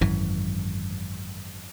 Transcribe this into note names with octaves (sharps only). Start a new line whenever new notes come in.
G#1 F#2 E3